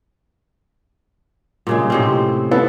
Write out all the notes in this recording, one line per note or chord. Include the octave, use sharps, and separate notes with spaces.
A#2 C#3 G#3
A2 C3 C4
B3 A4